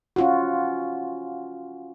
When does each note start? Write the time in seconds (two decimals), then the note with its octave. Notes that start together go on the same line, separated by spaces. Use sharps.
0.16 C#4 F4 F#4